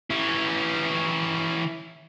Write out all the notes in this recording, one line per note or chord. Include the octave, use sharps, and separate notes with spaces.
E3 C#4